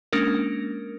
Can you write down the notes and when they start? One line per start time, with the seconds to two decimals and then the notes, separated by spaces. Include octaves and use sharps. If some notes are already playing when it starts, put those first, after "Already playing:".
0.12 G#3 A#3 C#4 D4 A#4